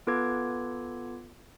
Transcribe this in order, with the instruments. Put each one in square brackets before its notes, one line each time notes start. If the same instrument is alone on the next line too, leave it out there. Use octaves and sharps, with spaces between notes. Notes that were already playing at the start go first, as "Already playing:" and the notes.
[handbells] B3 F4 A4 B4 D6 G#6